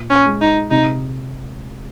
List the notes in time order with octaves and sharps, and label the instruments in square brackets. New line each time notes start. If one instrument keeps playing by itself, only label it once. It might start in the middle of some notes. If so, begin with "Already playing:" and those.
Already playing: [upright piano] A#2
[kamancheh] C#4
[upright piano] G#3
[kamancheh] D#4
[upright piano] C3 [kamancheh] D#4